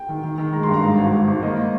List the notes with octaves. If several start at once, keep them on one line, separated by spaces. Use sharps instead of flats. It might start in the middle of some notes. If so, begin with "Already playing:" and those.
Already playing: G5
D#3
D#3
D#3
G#3 A#5
C6
G2 A#5
G#2 F5
G#1
G#1
G#1
A#3 D#5
A#3